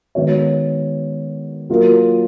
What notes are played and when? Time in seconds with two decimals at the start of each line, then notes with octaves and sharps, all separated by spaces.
0.15 D#3 G#3 B3 F#4 C#5
1.70 F#3 A#3 F4 A#4